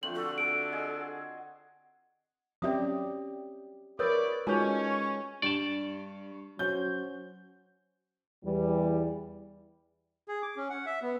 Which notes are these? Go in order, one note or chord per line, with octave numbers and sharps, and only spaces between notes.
D3 F3 A3 C4 F#7
F#4 A4
A4 D7
G#4 D#5 F#5
F#3 C4 C#4 G4 D5 E5 D#6
E4 F#4 A#4 B4 C#5 D5 D#6
G#3 C#4 D#4 F4 F#4 C#5 G#5 A5
G2 G3 D5 G5 A5 C#6
F#3 C#4 F#4 C5 G6
E2 E3 G3
G#4
D6
C#4
F#5
E5
B3